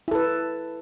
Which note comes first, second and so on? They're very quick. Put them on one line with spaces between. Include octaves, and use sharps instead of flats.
E4 A4 B4